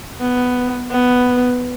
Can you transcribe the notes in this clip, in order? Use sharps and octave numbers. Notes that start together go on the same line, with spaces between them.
B3
B3